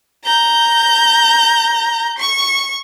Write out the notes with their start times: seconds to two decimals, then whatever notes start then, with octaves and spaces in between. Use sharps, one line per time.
0.24 A#5 G6
2.19 C#6